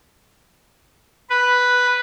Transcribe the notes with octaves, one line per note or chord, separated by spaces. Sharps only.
B4